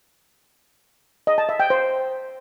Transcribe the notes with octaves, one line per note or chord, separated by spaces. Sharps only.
D#5
A5
E5
G5
C5